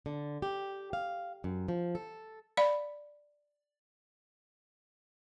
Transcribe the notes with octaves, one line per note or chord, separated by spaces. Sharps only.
D3
G4
F5
F#2
F3
A4
D5 F5 B5